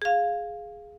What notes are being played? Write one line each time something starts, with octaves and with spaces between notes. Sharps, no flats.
G#4 F5